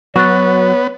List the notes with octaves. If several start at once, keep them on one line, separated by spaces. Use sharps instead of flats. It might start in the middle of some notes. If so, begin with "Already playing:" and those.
F#3 B3 F#4 C#5 C#6 F#6 A6